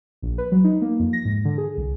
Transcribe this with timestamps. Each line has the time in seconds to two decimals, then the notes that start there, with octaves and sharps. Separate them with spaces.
0.22 A#1
0.38 B4
0.52 F#3
0.64 D#4
0.82 A#3
0.99 F2
1.13 A#6
1.25 G#2
1.45 D3
1.58 G#4
1.77 C2